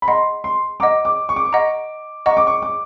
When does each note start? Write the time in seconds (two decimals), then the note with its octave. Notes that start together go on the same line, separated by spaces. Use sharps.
0.02 B5
0.08 D#5 F#5 A#5 C6
0.44 C6
0.80 D#5 F#5 A#5 D6
1.05 D6
1.29 C#6
1.36 D6
1.45 C#6
1.53 D#5 F#5 A#5
2.26 D#5 F#5 A#5 C#6
2.37 D6
2.47 C#6
2.62 D6